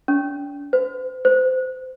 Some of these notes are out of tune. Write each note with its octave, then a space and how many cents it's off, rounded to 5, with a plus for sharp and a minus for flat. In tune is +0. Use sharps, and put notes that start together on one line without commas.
D4 -40
C5 -40
C5 -25